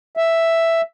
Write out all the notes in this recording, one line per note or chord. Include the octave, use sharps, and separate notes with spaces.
E5